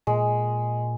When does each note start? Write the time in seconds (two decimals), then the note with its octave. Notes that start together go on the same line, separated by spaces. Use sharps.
0.07 A#2 G#3